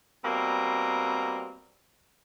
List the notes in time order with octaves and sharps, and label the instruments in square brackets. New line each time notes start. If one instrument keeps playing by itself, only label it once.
[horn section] B2 G3 A#3 C4 A#5